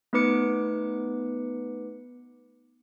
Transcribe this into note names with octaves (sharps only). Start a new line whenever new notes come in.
A3 B3 D#4 B4 D6 C#7